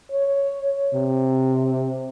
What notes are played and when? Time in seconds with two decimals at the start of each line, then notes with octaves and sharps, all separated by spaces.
0.11 C#5
0.95 C3